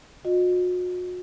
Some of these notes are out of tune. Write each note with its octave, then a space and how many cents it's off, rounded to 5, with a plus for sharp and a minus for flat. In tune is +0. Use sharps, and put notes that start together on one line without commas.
F#4 -40 D#5 -20